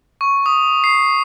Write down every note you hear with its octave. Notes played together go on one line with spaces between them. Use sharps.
C#6
D#6
C7